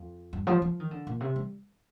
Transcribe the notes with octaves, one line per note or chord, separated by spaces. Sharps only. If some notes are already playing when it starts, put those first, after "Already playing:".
Already playing: F2
G2
F3
F3
D#3
D3
A#2
C3
G3